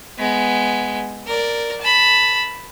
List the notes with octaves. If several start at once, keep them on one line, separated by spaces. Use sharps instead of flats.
G#3 B3
A#4 D5
A5 B5